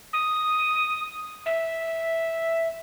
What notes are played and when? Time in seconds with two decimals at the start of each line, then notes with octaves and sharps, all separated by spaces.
0.13 D#6
1.46 E5